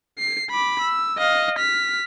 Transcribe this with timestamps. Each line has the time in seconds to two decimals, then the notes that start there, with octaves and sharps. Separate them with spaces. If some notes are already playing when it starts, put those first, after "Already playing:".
0.18 C7
0.51 B5 D6
0.81 E6
1.18 D#5 F5
1.58 F6 B6